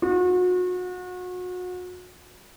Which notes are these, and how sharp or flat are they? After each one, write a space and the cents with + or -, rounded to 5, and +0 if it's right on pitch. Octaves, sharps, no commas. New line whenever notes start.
F#4 -35